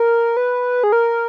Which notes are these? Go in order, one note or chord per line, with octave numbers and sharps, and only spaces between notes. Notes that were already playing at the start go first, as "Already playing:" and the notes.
Already playing: A#4
B4
G#4
A#4